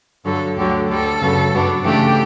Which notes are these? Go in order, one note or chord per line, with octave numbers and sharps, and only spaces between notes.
G2 D3 F#3 A4
D2 D3 F#3 G4
D2 D3 G3 A4
F#2 C#3 F#3 B3
G2 F#3 B3 D4
C#3 E3 A3 D4 G4